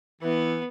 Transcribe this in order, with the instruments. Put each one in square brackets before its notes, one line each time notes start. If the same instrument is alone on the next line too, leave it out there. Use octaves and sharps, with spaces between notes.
[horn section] E3 [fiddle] B3